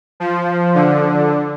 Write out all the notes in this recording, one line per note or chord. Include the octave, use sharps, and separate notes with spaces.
F3
D3